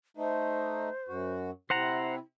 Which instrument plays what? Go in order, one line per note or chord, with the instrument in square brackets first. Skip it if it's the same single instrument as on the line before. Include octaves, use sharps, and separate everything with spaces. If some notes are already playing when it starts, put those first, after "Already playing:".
[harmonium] A3 D#4 [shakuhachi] C5
[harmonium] F#2 F#4
[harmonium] C3 [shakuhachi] E4 [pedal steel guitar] C5 F#5 A#5